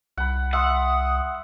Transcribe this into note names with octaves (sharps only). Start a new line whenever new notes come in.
C2 F#5 B5
E5 F#5 C6 D#6